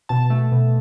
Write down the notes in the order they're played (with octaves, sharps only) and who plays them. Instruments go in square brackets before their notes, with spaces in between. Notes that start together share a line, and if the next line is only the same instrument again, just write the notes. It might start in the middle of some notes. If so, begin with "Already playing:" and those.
[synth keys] B2 A5
A3
B2